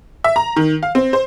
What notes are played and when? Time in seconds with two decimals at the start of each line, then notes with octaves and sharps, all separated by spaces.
0.24 E5
0.36 A#5
0.56 D#3
0.83 F5
0.95 C4
1.13 C5